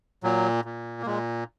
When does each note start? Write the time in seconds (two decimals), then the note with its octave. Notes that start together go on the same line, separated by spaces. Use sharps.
0.23 A#2 F#3
0.65 A#2
1.02 A#3
1.06 A#2 G#3